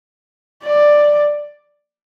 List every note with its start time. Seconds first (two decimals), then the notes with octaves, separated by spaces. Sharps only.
0.63 D5